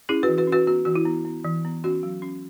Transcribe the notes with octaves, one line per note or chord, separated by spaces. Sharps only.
C#4 E4 G#4
F#4 B4
E3
F#4 B4
C#4
F#4 B4
B3 F#4
E3 F#4
E4
B3
B3
E3
B3
C#4 F#4
F#3
C#4